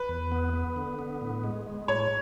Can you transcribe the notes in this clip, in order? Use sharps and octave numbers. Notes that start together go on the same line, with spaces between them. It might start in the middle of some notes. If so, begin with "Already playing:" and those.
Already playing: B4
E2
B3
B3
D3
B3
A2
G#3
G#3
A2 C#5